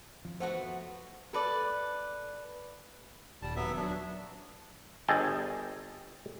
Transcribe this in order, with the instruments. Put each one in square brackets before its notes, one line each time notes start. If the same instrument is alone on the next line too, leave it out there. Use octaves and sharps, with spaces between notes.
[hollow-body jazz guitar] F2 F3
[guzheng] A3 B3 F#4 [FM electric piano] C5 F#5
[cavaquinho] A4 B4 D5
[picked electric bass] D#1 [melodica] G3 A5
[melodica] F#3 B3 E5
[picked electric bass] F#3 [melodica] D4
[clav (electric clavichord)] G1 G#4 A4 D#5 G5 A5